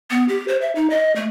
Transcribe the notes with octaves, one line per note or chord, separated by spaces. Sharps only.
B3
G4
C5
E5
D#4
D#5
A3